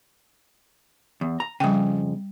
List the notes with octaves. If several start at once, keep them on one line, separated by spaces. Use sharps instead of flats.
E2
A#5
F2 C#3 G3 G5